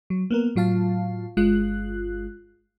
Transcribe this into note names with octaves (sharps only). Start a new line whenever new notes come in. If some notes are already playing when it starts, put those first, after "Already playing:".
F#3
A#3 B3 A#4
A2 F#3 F4 F5 A5
G1 G#3 F4 F#6